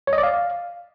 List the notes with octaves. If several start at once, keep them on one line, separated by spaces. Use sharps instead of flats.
C#5
D#5
D5
F5